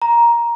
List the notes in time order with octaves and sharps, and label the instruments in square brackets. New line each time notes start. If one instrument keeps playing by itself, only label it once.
[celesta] A#5